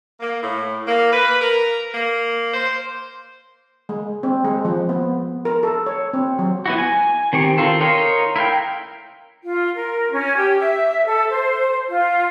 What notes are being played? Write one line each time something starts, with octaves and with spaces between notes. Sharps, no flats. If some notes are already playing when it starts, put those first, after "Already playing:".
A#3
A2
A#3
B4
A#4
A#3
C5
G#3
C4
G#3
F3
B3
A#4
A4
C#5
C4
F#3
B3 E4 F#4
G#5
D#3 C4 G4 C#6
D#3 C4 F4 A4
D#4 A#4 C#5 F5 C6
E4 A#4 F5 G5
F4
A#4
C#4
G4
E5
A4
C5
F4